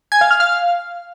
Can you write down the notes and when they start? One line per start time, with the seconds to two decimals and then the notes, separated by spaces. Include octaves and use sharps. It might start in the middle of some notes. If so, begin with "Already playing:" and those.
0.12 G#5
0.21 F5
0.31 F6
0.40 F5